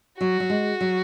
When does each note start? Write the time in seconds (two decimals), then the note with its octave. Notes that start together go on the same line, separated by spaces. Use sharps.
0.20 F#3 F#4
0.40 F#3
0.50 G#3
0.81 F#3